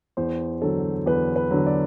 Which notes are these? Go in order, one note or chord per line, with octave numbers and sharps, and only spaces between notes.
E2 C5
D3 F#3 A4
E2 B4
B4
D3 F#3
D5